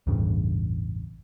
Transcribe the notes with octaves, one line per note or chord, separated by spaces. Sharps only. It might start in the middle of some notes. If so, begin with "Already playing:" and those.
A1 E2 G2 C#3